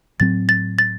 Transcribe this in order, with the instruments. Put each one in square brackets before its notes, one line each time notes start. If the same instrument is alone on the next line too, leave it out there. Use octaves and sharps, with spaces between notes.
[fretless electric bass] A2 F#3 C4 [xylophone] A6
[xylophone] A6
A6